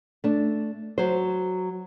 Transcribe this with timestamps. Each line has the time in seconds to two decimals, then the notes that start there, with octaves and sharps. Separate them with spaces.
0.24 A3 D4
0.98 F#3 C5